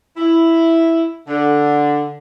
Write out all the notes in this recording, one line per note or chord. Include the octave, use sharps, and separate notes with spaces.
E4
D3